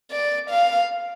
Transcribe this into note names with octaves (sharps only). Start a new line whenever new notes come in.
D5
F5